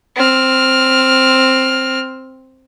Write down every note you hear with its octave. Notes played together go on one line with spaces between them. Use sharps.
C4 F6